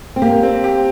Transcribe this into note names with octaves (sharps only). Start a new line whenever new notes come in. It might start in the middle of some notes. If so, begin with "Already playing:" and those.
C4
A#3 G4
C4
G4